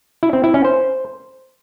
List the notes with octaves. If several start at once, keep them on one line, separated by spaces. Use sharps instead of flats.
E4
C4
E4
C#4
C5